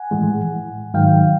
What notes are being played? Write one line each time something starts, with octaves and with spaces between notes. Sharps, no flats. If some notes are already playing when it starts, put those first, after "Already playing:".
Already playing: F#5 G#5
A2 E3 G#3
G#2 D#3 F#3 F5 G5